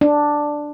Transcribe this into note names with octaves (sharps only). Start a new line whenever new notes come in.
D4